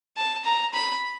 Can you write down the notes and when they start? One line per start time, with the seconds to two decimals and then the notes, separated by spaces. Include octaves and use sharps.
0.17 A5
0.44 A#5
0.73 B5